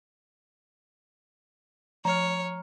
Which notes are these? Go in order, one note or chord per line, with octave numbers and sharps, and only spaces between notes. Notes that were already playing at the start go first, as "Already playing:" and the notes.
F3 C#5 A#5 F6